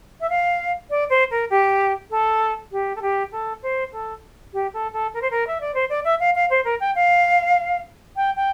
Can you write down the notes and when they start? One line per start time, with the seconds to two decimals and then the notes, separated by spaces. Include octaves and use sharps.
0.21 E5
0.30 F5
0.90 D5
1.10 C5
1.31 A#4
1.50 G4
2.10 A4
2.72 G4
2.96 A4
3.02 G4
3.32 A4
3.63 C5
3.92 A4
4.53 G4
4.73 A4
4.93 A4
5.14 A#4
5.22 C5
5.31 A#4
5.47 E5
5.61 D5
5.74 C5
5.89 D5
6.04 E5
6.20 F5
6.35 F5
6.50 C5
6.64 A#4
6.80 G5
6.95 F5
8.16 G5
8.36 G5